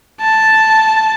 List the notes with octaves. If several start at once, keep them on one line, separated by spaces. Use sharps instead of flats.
A5